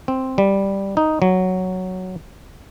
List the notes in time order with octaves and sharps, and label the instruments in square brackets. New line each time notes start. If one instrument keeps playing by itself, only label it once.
[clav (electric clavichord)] C4
G3
D#4
F#3